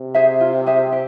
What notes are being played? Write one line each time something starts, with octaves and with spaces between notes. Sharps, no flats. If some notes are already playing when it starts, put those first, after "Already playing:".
Already playing: C3
G#4 C5 E5
F4
G#4 C5 E5
G4